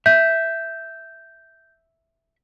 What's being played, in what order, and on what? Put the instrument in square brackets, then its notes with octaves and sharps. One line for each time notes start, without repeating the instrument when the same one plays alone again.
[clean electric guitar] E5 [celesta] G6